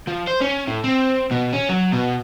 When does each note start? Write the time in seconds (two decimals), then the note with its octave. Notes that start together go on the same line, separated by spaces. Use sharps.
0.07 F3
0.27 C5
0.41 C#4
0.68 A2
0.84 C4
1.31 B2
1.53 C#4
1.69 F#3
1.93 B2